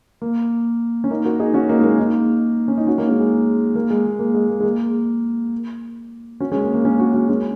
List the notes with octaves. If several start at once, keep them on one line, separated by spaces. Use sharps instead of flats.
A#3
C#4
A#3 D#4
F#4 A#4
D#4 G#4
C#4 F#4
A#3 D#4
G#3
A#3
A#3 D#4
C#4
D#4
C#4 F#4
A#3 D#4
G#3 C#4
G#3
A#3
G#3
A#3
A#3
G#3
A#3
G#3
A#3
C#4 F#4
G#3 C#4
A#3
A#3
G#3 C#4
C#4 F#4
C#4 F#4
G#3 C#4